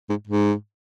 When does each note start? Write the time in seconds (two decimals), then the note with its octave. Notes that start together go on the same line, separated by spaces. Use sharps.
0.10 G#2
0.27 G#2